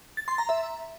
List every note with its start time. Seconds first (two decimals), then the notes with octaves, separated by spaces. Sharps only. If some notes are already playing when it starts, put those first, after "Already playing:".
0.17 A6
0.28 C6
0.38 A#5
0.49 E5